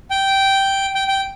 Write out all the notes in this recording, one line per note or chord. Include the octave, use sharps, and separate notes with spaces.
G5
G5
G5